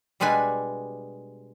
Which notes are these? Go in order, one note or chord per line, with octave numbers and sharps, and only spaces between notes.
B2 G3 G#3 D4 B4 G#5